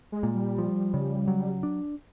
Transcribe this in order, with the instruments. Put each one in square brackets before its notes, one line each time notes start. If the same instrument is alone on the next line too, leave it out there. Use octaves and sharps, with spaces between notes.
[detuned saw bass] G#3
[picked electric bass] A#2
[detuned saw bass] G3
[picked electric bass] F3
C#3
F#3
D4